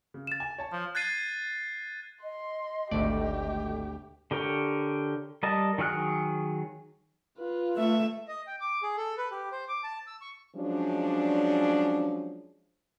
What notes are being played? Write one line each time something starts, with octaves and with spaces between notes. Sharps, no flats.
C#3
A6 E7
G#5
C#5 A5
F3
F#6 G#6 A6 C7 D#7
D#5 C6
G#1 D2 A3 G4 D5
D3 G4 A#4 C#5
G3 A#4 D#5 A5
D#3 F#3 G#4 F6 F#6
F4 B4
A3 E5
D#5
G5
D6
G#4
A4
B4
G4
C5
D6
A5
E6
C#6
F3 F#3 G#3 C#4 D4